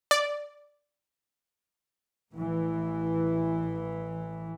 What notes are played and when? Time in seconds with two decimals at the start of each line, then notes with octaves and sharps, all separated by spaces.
0.11 D5
2.31 A1 E3